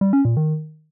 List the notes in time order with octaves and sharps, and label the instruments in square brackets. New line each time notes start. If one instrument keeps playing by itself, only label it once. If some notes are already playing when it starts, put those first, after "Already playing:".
[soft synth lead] G3
C#4
A#2
D#3